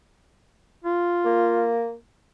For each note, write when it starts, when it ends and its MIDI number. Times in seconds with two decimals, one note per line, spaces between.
0.84 1.73 65
1.25 1.95 58